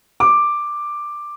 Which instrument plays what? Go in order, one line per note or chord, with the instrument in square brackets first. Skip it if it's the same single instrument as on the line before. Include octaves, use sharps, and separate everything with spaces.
[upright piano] D6